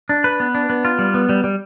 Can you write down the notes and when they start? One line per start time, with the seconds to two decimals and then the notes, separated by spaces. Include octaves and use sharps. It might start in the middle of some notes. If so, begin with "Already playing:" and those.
0.09 D4
0.24 B4
0.40 B3
0.55 D4
0.70 B3
0.85 F4
0.99 G3
1.14 B3
1.29 G3
1.44 G3